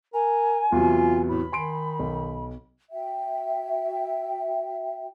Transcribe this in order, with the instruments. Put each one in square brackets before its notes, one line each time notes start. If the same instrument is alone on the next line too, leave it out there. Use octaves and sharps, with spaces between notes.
[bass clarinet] A#4 [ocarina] G#5
[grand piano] E2 C3 F#3 [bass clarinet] F4
[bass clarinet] A2 [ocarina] B5
[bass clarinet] D#3 [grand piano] G#5 C6 D7
[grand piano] B1
[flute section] F#4 E5 G5